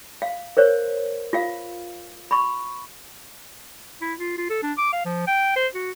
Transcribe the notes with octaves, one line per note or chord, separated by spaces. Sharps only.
F5
A#4 C5 C#5
F4 F5
B5 C#6
E4
F4
F4
A4
D4
D6
F5
F3
G5
C5
F#4